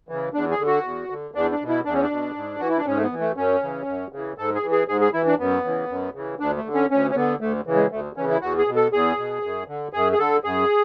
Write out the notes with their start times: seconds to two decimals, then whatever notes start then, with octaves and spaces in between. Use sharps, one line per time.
0.09 C#3 E3
0.34 E2 D4
0.51 G#4
0.59 D3
0.67 F#4
0.84 E2
1.10 D3
1.34 E2 D4
1.52 D4
1.61 B2
1.68 E4
1.85 E2 D4
1.94 C#4
2.02 D4
2.11 B2
2.36 G#2
2.59 E3 F#4
2.69 E4
2.77 D4
2.86 G#2 C#4
2.97 A3
3.03 B3
3.12 E3
3.20 A3
3.36 F#2 C#4
3.62 C#3 E3
3.87 F#2
4.12 C#3 E3
4.38 G#2 A4
4.55 G#4
4.63 E3
4.72 G#4
4.88 G#2 G#4
5.01 G#4
5.13 E3 E4
5.26 D4
5.39 F#2 B3
5.64 C#3 E3
5.89 F#2
6.14 C#3 E3
6.40 D2 D4
6.57 A3
6.65 D3
6.74 C#4
6.91 D2 C#4
7.10 C#4
7.16 D3 B3
7.41 D2 A3
7.67 C#3 E3
7.75 G#3
7.92 D2 A3
8.16 C#3 E3 C#4
8.29 E4
8.42 E2 F#4
8.58 G#4
8.67 B2
8.76 A4
8.93 E2 G#4
9.18 B2
9.43 F#2
9.68 D3
9.93 F#2 G#4
10.12 G#4
10.19 D3 A4
10.44 F#2 G#4